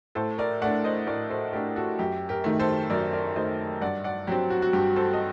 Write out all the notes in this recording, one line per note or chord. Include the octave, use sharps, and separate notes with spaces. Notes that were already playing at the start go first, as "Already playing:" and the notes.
A2 A4 C5
A#4 D5
A3 D4 D5 F#5
C5 D#5
A2 A#4 D5
A4 C5
A3 D4 G4 A#4
F#4 A4
F#2 G4
G4 A#4
D#3 A3
A4 C5
F#2 A#4 D5
A#4 D5
D#3 A3 C5 D#5
G2 D5 F#5
D5 F#5
F#3 C4 G4
F#4
F#4
G2 G4
A4 C5
D#5